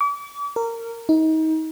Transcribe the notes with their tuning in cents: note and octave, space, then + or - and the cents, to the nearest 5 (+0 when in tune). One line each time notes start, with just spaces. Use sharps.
D6 -40
A#4 -20
D#4 +30